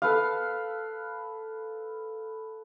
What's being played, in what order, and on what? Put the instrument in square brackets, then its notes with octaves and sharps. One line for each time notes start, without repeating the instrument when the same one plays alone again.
[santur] A4 B4 F5